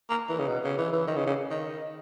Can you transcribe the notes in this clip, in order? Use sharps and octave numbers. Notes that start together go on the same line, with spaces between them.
A#3
E3
C#3
B2
C#3
E3
E3
D#3
C#3
C#3
D#3